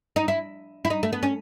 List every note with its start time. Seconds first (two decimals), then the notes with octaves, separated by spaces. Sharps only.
0.16 D#4
0.28 E4
0.85 E4
0.90 D#4
1.03 A3
1.13 B3
1.23 C#4